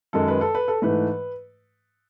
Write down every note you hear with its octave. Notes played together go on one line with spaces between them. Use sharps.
F#2 D#3 G#3 A4
B4
A4
B4
A4
G#2 E3 A3 B4